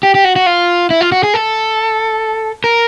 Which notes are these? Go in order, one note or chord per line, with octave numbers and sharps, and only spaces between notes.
G4
G4
F#4
F#4
F4
E4
F4
F#4
G#4
A4
A#4